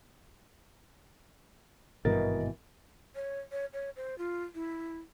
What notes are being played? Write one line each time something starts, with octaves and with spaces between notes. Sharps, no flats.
G#1 G2 B2 E3 A#4 D#5 A6
C#5
C#5
C#5
C5
F4
E4